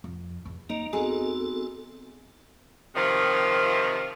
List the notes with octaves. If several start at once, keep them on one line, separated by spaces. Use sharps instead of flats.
F2
E2
A#3 D#4
B3 C4 D#4 F#4 G#4 A4
C3 D#3 F3